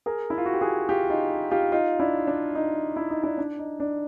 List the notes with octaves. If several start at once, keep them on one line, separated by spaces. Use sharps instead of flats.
G#4 A#4
E4
F4
F#4
G4
F#4 G#4
F4 G4
D#4 F4
F4 G4
D#4 F4
D4 E4
D4
D#4
E4
D#4
D4 E4
D4
D#4
D4